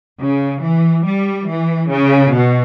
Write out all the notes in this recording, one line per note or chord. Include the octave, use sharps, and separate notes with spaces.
C#3
E3
G3
E3
C#3
B2